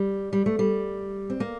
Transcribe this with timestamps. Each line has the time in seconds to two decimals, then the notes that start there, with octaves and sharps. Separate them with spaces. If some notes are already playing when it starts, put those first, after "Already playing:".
Already playing: G3
0.33 G3
0.46 A3
0.59 G3
1.30 C4
1.40 A#3